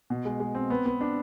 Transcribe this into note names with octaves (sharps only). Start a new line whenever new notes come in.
B2
G#3
G#3
C4
B3
B3
D4